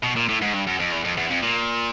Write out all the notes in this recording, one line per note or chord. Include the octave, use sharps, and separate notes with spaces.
B2
A#2
A2
G#2
G2
F#2
F2
E2
F2
E2
F2
A#2